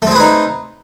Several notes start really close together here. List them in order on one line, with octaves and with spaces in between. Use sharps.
A3 C4 G#4 B4 D#4